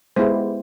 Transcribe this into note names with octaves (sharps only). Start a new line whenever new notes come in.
G#3 B3 E4 G4 C5